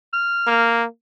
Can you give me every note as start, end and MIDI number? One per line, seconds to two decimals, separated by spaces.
0.13 0.72 89
0.47 0.85 58